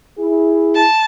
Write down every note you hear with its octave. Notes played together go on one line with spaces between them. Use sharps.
E4 G#4
A5